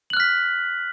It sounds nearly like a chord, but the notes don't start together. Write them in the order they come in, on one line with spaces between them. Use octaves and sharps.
F#7 F#6 F6 B6